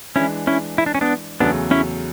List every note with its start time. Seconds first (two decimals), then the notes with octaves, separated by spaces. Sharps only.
0.16 E3 G#3 C#4 D4 E4
0.47 C#4 E4
0.78 E4
0.86 D4
0.95 C#4
1.01 B3 D4
1.40 E2 C#3 F#3 A3 B3 D4
1.71 C#4 E4